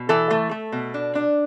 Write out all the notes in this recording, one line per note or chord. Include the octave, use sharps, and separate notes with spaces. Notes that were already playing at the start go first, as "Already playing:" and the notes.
Already playing: B2
E3 A4
A3
A3
B2
D4
D4